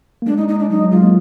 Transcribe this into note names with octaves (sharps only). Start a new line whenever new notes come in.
A#3
G#3 D4
D#4
D#4
D4
F#3 D#4
F#3
G#3 F4
A#3